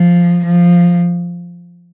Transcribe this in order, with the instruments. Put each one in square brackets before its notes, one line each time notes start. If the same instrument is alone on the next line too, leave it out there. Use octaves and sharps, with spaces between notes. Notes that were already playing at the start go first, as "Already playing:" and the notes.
Already playing: [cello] F3
F3